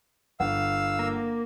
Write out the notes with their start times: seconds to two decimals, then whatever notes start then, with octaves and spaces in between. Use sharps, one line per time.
0.40 G1 F5 F#5 E6
0.99 A#3